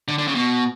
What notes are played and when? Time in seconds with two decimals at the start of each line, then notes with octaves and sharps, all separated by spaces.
0.08 D3
0.18 D3
0.27 C#3
0.35 B2